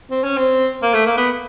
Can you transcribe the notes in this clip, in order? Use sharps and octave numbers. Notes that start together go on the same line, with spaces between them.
C4
C#4
C4
A#3
A3
A#3
B3